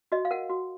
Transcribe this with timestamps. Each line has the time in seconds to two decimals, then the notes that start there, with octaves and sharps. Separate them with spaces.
0.12 F#4 D#5
0.25 F5
0.31 A#4 F#5
0.50 F#4